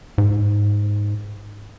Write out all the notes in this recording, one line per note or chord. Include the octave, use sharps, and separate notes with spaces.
G#2